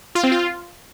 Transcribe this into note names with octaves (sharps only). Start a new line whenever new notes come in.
F4
C4
F4